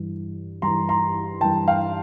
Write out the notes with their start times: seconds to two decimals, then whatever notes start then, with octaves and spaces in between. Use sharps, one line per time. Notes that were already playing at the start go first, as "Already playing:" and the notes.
Already playing: G2 E3
0.62 G2 E3 A#5 C6
0.89 A#5 C6
1.41 G2 E3 G5 A5
1.68 F5 G5